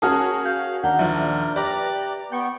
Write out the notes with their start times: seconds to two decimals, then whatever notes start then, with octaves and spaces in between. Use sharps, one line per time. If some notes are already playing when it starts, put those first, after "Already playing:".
0.02 C#4 F#4 G#4 A#4 A5 D#6 F6
0.45 F5 G6
0.84 D#2 D4 A#4 F#5 G6
0.99 A#1 F3 E5
1.56 G4 B4 D5 A#5 D6 F#6
2.32 B3 G5 C#6